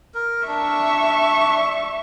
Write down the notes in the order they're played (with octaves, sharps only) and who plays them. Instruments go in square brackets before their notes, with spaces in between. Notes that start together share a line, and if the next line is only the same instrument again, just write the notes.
[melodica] A#4
[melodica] D4 [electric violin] E5 C#6